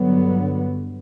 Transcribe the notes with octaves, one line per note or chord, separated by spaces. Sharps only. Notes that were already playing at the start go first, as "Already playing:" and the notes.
Already playing: G2 D3 F#3 B3